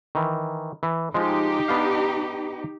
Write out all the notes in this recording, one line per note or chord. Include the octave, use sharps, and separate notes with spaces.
D#3 E3
E3
F3 G#3 D#4 G4
B3 D4 F5